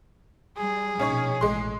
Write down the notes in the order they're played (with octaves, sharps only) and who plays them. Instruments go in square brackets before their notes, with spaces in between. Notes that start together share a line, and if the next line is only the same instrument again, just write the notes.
[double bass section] G3 [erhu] G#4
[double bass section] A#1 B2 [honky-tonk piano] C#4 D#4 C#5
[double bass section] A1 [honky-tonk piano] G#3 C6